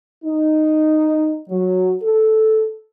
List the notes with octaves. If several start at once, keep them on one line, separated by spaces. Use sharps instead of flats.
D#4
F#3
A4